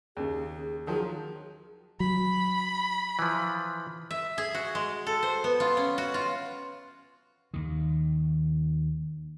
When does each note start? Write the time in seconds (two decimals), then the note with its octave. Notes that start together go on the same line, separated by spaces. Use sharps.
0.17 D#2 C#3 G#4
0.87 D#3 F3 F#3 G#4
2.00 F#3 B5
3.19 E3 F3
4.11 E5
4.38 G#4
4.55 F#4
4.75 G#3
5.07 A4
5.23 C5
5.44 B3
5.60 F4
5.77 C#4
5.98 F#4
6.14 F4
7.54 D#2 D#3